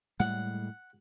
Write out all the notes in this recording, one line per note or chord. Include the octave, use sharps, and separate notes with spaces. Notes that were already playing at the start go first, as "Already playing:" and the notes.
A2 G3 G#3 F#5